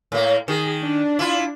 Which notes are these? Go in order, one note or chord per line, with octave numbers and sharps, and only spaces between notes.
A2 A#3
D#3 G#4
D4
E4 F4